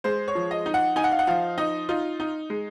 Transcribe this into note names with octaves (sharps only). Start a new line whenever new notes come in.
G#3 C5
C#5
F3
D#5
D#4
F#5
D#4 G#5
F#5
F5
F#5
F3 F5
D#4 D#5
D#4 F4
D#4
G#3